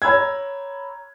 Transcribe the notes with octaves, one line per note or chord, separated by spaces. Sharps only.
C#5 A#5 B5 E6 G#6